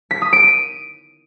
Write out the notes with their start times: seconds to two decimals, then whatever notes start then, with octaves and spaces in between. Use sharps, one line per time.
0.11 B6
0.22 D#6
0.33 D7
0.44 D#7